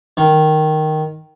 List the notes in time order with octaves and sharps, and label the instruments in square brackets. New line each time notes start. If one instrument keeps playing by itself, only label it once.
[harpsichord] D#3